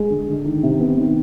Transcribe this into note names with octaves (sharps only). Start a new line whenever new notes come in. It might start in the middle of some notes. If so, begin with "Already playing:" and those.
Already playing: G#3
D3
D3
D#3
C3
B3
D#3